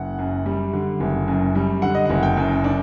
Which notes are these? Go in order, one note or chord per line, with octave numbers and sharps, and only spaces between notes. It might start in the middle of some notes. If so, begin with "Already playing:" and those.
Already playing: F#1 F#5
F#2
G3
D3
F#1
F#2
G3
D3 F#5
D#5
F#1 F#5
G5
F#2
D4